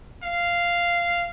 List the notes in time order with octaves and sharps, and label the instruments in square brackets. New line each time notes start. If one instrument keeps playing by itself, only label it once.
[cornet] F5